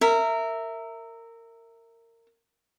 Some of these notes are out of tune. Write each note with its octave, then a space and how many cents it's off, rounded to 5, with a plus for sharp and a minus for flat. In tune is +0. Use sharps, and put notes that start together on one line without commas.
A#4 -20 E5 +0